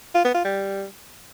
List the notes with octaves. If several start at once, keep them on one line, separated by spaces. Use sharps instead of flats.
F4
B3
F4
G3